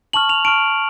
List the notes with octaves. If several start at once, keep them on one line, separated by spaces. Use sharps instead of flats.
A5 C#6 F6 F#7
F7
A5 C#6 F6 D7